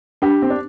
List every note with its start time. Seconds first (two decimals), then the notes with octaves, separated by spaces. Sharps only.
0.22 D4 G4
0.42 C4
0.50 D4